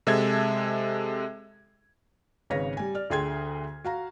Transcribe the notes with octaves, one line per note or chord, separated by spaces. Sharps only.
C3 G#3 A4 E5 A5 G#6
G#1 C#3 B4 C#5 F5 A#6
G3 G#5
D5 F6
D2 D3 G#4 G5 C6 G#6
F#4 F5 A#5